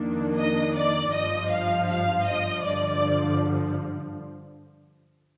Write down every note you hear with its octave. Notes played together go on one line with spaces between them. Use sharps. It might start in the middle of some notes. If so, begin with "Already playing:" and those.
Already playing: F2 D#3 A#3 D4
D#5
D5
G1 G2 F3 D#5
F5
F5
D#5
G2 D3 F3 D5